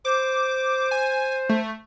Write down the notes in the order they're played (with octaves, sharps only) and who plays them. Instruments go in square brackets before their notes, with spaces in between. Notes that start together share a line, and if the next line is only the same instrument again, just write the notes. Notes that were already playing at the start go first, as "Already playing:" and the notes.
[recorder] C5 [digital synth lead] D6
[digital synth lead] G#5
A3